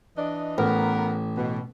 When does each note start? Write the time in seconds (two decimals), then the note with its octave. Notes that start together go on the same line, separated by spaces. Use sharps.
0.17 E3 D4 D#5
0.58 A1 B3 A#4
1.36 B2